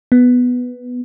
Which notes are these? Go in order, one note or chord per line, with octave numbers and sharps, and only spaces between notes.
B3